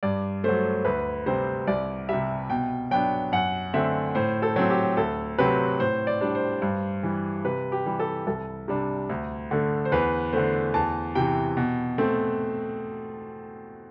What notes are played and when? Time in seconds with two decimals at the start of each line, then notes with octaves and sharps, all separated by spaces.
0.03 G2 D5
0.44 F#3 A3 C5
0.85 D2 B4
1.26 C3 G3 C4 C5
1.67 C2 D5
2.09 C3 G3 E5
2.50 B2 G5
2.91 F#3 B3 D4 G5
3.32 F#2 F#5
3.74 D3 A3 C4 E5
4.15 A2 C5
4.42 A4
4.56 F#3 C4
4.70 G4
4.97 D2 A4
5.38 C3 F#3 C4 B4
5.80 A2 C5
6.07 D5
6.21 G3 D4
6.35 C5
6.62 G2
7.03 E3 G3
7.45 C3 B4
7.72 G4
7.86 E3 G3
8.00 A4
8.27 C2 A4
8.68 C3 G3 D4
9.09 D2
9.51 D3 A3
9.85 C5
9.92 E2 B4
10.33 D3 A3 C5
10.74 E2 A5
11.15 C3 E3 G5
11.57 B2
11.98 A3 C4